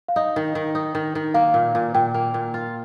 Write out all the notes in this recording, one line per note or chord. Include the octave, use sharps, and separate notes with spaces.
F5
D#4 D#5
D#3
D#3
D#4
D#3
D#3
A#3 F5
A#2
A#2
A#2 G5
A#3
A#2
F4